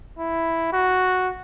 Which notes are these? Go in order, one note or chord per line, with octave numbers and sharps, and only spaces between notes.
E4
F#4